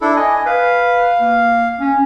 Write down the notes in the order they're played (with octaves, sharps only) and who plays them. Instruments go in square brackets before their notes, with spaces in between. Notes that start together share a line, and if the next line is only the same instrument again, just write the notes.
[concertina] D4 E4 A4
[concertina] D#5 [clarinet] G#5
[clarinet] B4 [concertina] F5
[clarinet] A#3
C#4